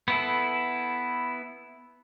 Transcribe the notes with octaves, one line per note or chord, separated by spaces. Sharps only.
B3 E4 A4